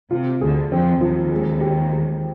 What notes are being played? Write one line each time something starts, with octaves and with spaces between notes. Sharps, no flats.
C3 F4
D2 D3 G#4
F2 F3 C4
D#2 D#3 F3
G#3
G4
G#3